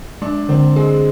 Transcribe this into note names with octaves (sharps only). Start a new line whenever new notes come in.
G#3 D4
D3 C4
G#3 G#4